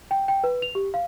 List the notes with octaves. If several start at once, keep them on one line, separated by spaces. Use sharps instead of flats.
G5
G5
B4
F7
G4
F5